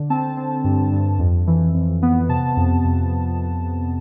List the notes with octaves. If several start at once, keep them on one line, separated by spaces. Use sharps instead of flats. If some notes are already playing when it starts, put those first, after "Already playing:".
Already playing: D3
C4 A5
C4
G2
G2
F2
E3
F2
B3
C3 A5
F2
F2